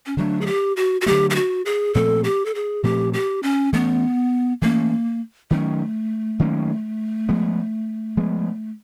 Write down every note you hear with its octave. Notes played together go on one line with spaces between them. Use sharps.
C#4
D3 F#3 A3 D4
G#4
G4
F#4
F#4
D3 F#3 A3 G4
G4
F#4
G#4
A#2 F3 A3 C4 A4
G4
A4
G#4
A#2 F3 A3 C4 G4
G4
C#4
E3 A3 B3 C#4
E3 A3 A#3 C#4
D#3 F#3 A3 A#3 C#4
D#3 F#3 A#3 C#4
F3 G#3 B3
F3 G#3 B3